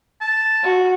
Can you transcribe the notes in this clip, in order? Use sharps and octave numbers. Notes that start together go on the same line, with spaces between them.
A5
F#4